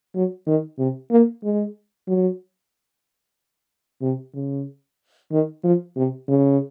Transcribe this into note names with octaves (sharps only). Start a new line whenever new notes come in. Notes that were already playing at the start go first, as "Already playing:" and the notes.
F#3
D#3
C3
A#3
G#3
F#3
C3
C#3
D#3
F3
C3
C#3